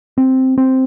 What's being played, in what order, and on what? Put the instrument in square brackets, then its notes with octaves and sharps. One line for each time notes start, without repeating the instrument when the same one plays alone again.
[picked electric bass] C4
C4